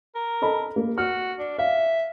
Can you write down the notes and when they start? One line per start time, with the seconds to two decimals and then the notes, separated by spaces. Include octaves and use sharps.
0.16 A#4
0.42 A4 D#5 B5
0.76 A#3
0.98 F#4 F6
1.39 D4
1.58 E5 F5